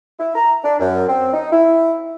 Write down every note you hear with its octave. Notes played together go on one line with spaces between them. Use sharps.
E4
A#5
D4
F#2
C4
D#4
E4